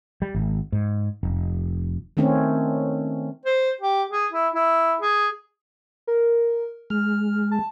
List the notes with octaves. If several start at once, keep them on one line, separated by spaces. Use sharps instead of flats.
G3
G#1
G#2
F1
D#3 A3 C4 C#4
C5
G4
G#4
E4
E4
G#4
A#4
G#3 F6
A5